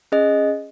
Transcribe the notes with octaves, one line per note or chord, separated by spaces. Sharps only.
C#4 G#4 D#5